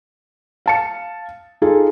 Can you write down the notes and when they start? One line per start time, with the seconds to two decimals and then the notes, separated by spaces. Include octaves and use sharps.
0.66 F5 A5 C#7
1.62 D#4 F4 G#4 A4